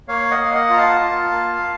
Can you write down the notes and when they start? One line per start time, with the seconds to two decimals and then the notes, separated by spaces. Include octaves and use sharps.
0.08 A#3 C#5 F5
0.31 D#5 F#5
0.39 A#3
0.45 F5
0.54 D#5 F#5
0.70 F4 A#5
0.78 F5 A5
1.01 F4
1.31 A#3